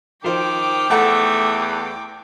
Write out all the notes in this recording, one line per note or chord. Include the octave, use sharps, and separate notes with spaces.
D#3 F3 C5 G5 D6
E2 A3 A4 F#5 A5